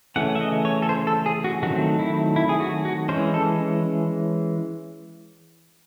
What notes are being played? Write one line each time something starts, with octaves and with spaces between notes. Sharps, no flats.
C#3 E3 A3 C#4 F#5
E5
D#5
C#5
A4
C5
A4
G#4
F#4
D#3 F#3 A3 C4 F#4
E4
E4
G#4
F#4
F#4
E3 G#3 C#4 C5
A4